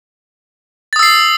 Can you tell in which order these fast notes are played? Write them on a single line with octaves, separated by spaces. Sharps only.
A6 D#6 E6 C7